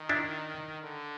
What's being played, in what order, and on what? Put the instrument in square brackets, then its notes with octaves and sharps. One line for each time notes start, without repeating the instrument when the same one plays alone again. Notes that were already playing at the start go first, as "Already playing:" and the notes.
Already playing: [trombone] D#3
[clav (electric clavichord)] D4 E4
[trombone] D3